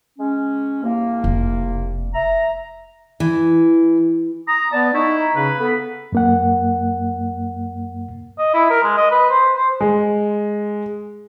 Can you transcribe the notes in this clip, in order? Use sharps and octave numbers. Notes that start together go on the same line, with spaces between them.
G#3 C#4
C2 A#3
F1
E5 A#5
E3
A#5 D#6
B3 D5 A5
D#4 E4 C#6
A#5
C#3 B4
B3 A4
F#2 A#3 F#5
D#5
E4
A#4
G#3
D#5
B4
C5
C5
G#3